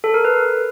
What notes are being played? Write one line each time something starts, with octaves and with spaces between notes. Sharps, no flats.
A4
A#4
B4